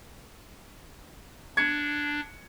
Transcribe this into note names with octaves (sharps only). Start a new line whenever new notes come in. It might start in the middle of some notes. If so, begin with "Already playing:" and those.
D4 G#6 C#7